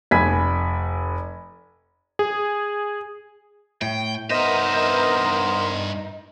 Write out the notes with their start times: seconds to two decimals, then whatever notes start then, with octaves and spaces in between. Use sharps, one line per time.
0.11 F1 G#5 B5 G#6 B6
2.19 G#4
3.82 A2 G5
4.30 G2 B3 D#4 A#4 C5 D#5 E5